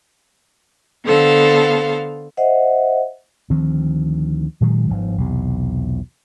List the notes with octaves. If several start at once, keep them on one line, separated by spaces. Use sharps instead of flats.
D3 B3 A4 C5 F5
C5 D#5 E5 F#5
D2 D#3 F3 C4
A#2 D#3 F#3 G#3
G1 G#2 F3
B1 E2 C3